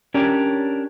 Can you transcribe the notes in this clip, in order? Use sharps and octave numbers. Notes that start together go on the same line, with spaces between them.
C#4 D4 G4 A#4 C#5 D5